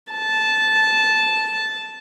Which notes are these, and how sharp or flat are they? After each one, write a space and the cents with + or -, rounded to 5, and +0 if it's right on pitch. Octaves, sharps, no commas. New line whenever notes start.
A5 -10